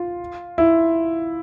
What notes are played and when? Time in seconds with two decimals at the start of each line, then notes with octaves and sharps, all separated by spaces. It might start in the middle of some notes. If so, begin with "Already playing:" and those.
Already playing: F4
0.58 E4